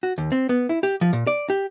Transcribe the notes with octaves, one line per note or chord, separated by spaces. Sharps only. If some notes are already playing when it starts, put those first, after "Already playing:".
F#4
D#2
C4
B3
E4
G4
F3
A#2
D5
G4